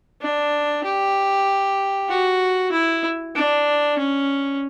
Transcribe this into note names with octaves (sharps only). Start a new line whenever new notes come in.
D4
G4
F#4
E4
D4
C#4